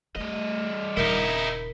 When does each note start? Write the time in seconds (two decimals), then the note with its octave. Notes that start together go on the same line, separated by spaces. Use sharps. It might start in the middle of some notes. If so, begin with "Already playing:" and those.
0.16 G3 A3 D#5
0.97 D#1 C#3 D#4 E4 A#4 B6 G7